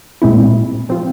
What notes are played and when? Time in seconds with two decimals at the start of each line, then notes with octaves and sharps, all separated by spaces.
0.22 A#2 G#3 C4 E4
0.89 F3 C4 F4